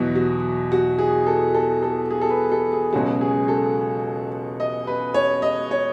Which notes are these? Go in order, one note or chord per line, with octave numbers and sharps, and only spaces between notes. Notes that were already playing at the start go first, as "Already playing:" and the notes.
Already playing: E2 B2 F#3 F#4
F#4
F#4
G#4
A4
A4
A4
G#4
A4
B4
A4
G#4
C#2 B2 F#3 C#4 F#4
G#4
A4
D#5
B4
C#5
D#5
C#5